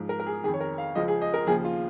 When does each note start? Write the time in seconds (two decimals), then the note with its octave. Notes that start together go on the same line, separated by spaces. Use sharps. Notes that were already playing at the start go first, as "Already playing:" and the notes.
Already playing: G#2 F3
0.09 A#4
0.20 A#4
0.27 G#4
0.44 D#3 G#4
0.48 F2
0.54 C#5
0.61 A#4
0.78 F5
0.95 C#2 C#3 F3 D#5
1.08 G#4
1.21 D#5
1.34 A#4
1.47 D#2 C#3 F3 G#4
1.65 F4